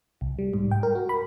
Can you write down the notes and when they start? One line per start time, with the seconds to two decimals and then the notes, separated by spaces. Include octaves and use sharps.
0.21 C2
0.39 G3
0.54 G#2
0.71 G5
0.83 A#4
0.95 F#4
1.09 B5